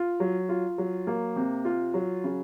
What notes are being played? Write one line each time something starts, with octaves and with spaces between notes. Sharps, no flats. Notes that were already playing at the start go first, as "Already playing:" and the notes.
Already playing: F4
F#3
F4
F#3
A#3
C3
F4
F#3
C#3